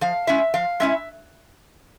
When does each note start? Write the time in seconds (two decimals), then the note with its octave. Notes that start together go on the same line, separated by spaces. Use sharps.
0.01 F3 F5
0.27 G#3 C#4 E4 E5
0.54 F3 F5
0.80 G#3 C#4 E4 E5